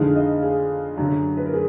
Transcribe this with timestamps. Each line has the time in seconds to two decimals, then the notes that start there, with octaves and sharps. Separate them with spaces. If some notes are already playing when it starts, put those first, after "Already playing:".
Already playing: F2 D3 G#3 D#4 F5
0.15 D#5
0.43 G#4
0.98 F#2 D3 F#3
1.37 B4
1.46 A#4
1.53 G#4